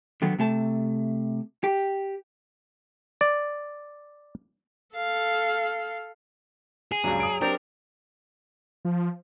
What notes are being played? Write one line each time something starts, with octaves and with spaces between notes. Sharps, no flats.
D3 D#3 F#3 B3
C3 A3 A5
G4
D5
A4 F5
G#4
C#2 G2 F#3
D#6 D7
C4 D4 G4 A#4
F3